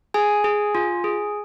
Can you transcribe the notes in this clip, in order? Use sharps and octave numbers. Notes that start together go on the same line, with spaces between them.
G#4 G#5
G#4
F4
G#4